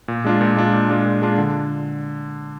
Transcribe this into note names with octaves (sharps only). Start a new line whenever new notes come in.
A#2
G#3 D4 F4
A#2
G#3 D4 F4
A#2
G#3 D4 F4
A#2
G#3 D4 F4
D3